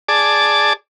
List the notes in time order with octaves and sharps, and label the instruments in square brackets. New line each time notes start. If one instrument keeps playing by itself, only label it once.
[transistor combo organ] G#4 D5 A5 D6